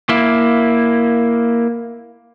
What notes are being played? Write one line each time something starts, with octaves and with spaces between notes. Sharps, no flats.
A#3 E4